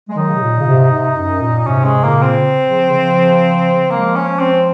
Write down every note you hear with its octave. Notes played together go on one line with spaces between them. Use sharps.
G#3
D#3 F#3 D#4
C#3
C3
A#2
C#3
G#2 C3
G#2 C3
F#2
A#2
G#2 C3 C#4
G#3
A#2 C#3 A#3
C4
C#3 F3
C#3 F3
F3 G#3 A#3
C#4
C4